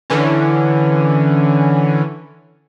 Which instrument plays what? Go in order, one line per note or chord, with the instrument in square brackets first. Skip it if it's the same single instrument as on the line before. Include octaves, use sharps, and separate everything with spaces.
[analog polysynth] D3 E3 C#4